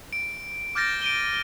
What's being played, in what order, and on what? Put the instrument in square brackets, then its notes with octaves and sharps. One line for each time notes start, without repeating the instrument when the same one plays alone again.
[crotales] D7
D6 F6 G6 A6 A#6 D7
D7 D#7 G7